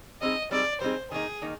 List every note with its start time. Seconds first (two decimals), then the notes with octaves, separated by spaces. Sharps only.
0.22 G3 C4 D#4 G#4 D#5
0.51 G3 C4 D#4 G#4 D5
0.81 G3 C4 D#4 G#4 C5
1.12 D#3 A#3 D#4 G#4
1.42 D#3 A#3 D#4